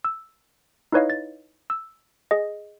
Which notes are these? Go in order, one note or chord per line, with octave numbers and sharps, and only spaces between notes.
E6
D#4 E4 B4 C#5 D#5 F5
A6
E6
G#4 D#5